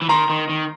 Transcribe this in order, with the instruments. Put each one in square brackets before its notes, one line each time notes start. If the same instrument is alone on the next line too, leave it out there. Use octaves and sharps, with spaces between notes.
[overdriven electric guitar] E3
[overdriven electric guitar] D#3 [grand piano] A#5 C6
[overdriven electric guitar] D#3
D#3